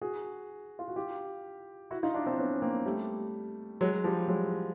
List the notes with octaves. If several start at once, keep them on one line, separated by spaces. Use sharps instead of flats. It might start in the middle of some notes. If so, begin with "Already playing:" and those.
F#4 G#4
F4
F#4
F4 G4
E4 F#4
D#4 F4
D4 E4
C4 D4
B3 C#4
C#4
A#3 C4
G3 A3
F#3 G#3
F3 G3
F#3 G#3